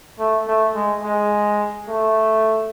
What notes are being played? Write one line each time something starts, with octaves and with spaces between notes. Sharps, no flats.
A3
A3
G#3
G#3
A3